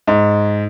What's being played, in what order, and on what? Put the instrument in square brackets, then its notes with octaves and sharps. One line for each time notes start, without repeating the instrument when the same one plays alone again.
[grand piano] G#2